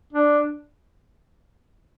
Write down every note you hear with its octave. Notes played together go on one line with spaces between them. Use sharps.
D4